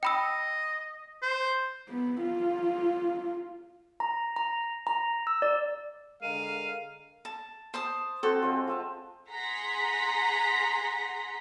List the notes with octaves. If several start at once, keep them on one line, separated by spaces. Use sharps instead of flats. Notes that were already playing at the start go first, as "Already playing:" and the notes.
D#5 G5 B5 E6
C5
B3
F4
A#5
A#5
A#5
E6
D5
D3 G#3 A#4 F5 D#7
A5
C5 A5 D#6
C4 F#4 A4
G#3 C4 F4
F4 E5 A5
G#4 F#5 A#5 C6 B6